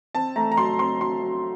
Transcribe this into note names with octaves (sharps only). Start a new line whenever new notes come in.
C4 A5
A3 A#5
A#5
F#3 C6
C4 C6
F#3 C6
F#3